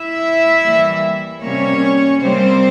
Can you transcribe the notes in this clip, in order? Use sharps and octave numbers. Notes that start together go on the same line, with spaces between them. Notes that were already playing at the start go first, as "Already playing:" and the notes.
Already playing: E4 E5
E3 G3 A#3
C3 G3 A#3 C#4 C#5
C3 G3 A#3 C4 C5